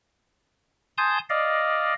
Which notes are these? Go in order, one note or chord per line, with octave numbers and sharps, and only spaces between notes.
G#5 A5 C6 D#6 G6
D5 D#5 F5